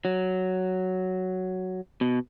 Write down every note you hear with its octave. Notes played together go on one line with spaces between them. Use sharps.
F#3
B2